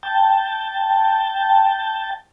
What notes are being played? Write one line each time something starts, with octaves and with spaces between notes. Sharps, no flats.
G5 A5